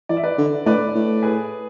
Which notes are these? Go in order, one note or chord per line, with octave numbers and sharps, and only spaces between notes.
E3 D5
E5
B4 D5
D3
A2 B4 D5
A2
G#4 B4